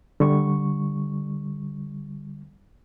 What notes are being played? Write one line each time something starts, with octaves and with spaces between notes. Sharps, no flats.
D3 G3 C#6